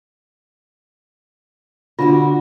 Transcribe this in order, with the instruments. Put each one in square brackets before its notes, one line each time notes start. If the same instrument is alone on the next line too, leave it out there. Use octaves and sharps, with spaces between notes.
[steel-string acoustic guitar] D3 D4 F#4 [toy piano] F4